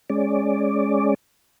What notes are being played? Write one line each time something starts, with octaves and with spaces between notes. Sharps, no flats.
G#3 C#4 D5